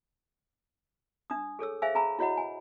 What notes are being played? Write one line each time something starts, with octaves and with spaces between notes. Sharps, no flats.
D4 D#6
G#4 A4 C#5 E6
G#4 C5 E5 F5 G#5 E6
G#4 G#5 A#5 B5 E6
E4 F#4 C#5 D#5 F#5 B5
G#5